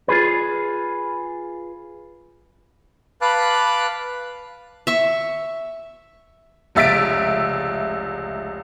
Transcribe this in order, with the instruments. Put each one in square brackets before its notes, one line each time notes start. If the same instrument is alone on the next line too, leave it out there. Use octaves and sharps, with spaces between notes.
[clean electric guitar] F4 G#4 B4
[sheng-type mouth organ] B4 F5 A5 B5 D6 F#6
[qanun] E5 C#6
[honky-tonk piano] F1 C#2 E5 A6 B6 D7